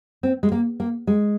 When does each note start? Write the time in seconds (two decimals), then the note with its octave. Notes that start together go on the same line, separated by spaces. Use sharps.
0.23 C4
0.43 G#3
0.52 A#3
0.80 A#3
1.07 G#3